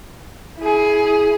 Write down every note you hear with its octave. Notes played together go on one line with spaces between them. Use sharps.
E4 G#4